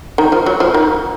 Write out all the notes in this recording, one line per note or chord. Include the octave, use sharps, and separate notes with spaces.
D#3
F3
F#3
F3
D#3